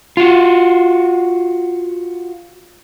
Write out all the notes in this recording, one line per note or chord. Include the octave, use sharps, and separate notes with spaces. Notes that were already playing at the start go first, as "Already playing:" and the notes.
F4 F#4